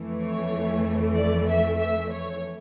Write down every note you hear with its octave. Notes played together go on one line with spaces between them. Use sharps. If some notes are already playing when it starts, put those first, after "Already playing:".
Already playing: F2 E3 A3
C#5
D5
E5
E5
C#5